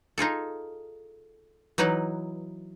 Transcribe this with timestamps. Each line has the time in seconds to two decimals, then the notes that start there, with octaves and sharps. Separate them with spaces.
0.18 D#4 F4 G#4 A4
1.78 E3 F#3 D#4 E4 B4